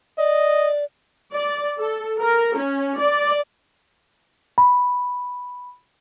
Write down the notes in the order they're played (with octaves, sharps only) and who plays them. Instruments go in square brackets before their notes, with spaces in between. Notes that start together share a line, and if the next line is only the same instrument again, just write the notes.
[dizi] D5 [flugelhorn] D#5
[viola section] D5
A4
A#4
C#4
D5
[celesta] B5